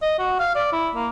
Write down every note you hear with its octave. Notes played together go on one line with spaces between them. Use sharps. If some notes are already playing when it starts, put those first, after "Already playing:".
D#5
F#4
F5
D5
E4
A#3